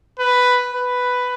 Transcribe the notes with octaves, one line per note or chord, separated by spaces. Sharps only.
B4
B4